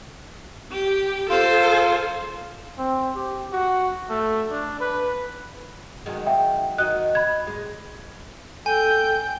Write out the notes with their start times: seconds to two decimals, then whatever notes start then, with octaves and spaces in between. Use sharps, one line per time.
0.71 G4
1.30 F4 A4 C5
2.78 C4
3.15 G4
3.52 F#4
4.10 A3
4.51 D4
4.80 B4
6.06 D#3 F#3 G#3
6.27 E5 G5
6.78 D#3 F#4 D#5 F#6
7.15 B5 G#6
7.47 A#2 G#3
8.66 A4 G5 G#5 G6